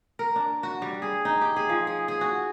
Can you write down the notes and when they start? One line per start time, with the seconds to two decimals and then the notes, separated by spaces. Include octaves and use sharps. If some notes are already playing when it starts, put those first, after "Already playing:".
0.19 A#4
0.36 D4
0.63 F#4
0.82 G3
1.02 G#4
1.25 D#4
1.41 G4
1.56 G#4
1.69 F3
1.87 G#4
2.08 G#4
2.21 F#4